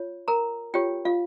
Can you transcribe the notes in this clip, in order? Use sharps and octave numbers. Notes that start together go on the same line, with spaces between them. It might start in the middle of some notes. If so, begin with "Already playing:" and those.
Already playing: F4 C#5
A#4 A#5
F4 G4 C#5 G5
F4 F5